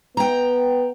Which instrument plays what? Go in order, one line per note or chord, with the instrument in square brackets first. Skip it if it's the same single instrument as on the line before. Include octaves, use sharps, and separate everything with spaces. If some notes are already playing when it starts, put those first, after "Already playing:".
[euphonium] B3 [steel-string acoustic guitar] G5 A#5